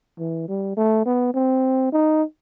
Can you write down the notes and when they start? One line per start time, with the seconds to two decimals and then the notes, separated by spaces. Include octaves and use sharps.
0.18 E3
0.48 G3
0.77 A3
1.05 B3
1.34 C4
1.92 D#4